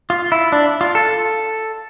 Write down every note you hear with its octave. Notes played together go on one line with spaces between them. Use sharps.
F4
E4
D4
F4
A4